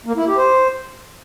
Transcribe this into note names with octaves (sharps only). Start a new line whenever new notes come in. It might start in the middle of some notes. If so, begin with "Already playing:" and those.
A#3
E4
G4
C5